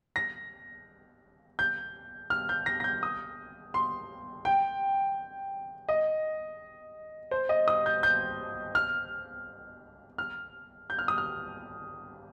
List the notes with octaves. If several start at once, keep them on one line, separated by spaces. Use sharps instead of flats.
A#6
G6
F6
G6
A#6
A#6
G6
D#6
C6
G5
D#5
C5
D#5
D#6
G6
G6
F6
F6
G6
F6
D#6
F6